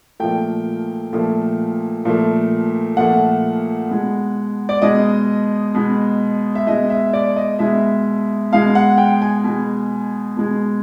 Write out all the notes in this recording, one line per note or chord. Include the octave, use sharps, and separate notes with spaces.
A#2 F3 A3 G5
A#2 F3 A3
A#2 F3 A3
A#2 F3 A3 F#5
B2 G#3
D5
B2 G#3 D#5
B2 G#3
E5
B2 G#3 D#5
E5
D5
D#5
B2 G#3 E5
B2 G#3 F5
F#5
G5
G#5
B2 G#3
B2 G#3